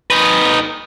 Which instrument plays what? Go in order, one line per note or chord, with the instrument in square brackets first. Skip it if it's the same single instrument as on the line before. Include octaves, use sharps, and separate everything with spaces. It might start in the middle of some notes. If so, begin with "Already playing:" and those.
[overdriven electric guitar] D#4 B4